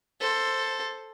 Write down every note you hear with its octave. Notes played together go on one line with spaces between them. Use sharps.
A4 C5